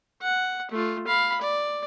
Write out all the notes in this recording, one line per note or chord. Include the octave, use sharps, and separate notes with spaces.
F#5
A3 F4
F5 B5
D5